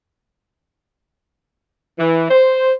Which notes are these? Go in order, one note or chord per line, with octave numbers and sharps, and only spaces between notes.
E3
C5